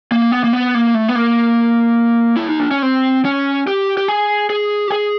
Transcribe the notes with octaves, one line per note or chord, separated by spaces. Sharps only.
A#3
B3
A#3
B3
A#3
A3
B3
A#3
E4
D#4
D4
C#4
C4
C#4
G4
G4
G#4
G#4
G4
G#4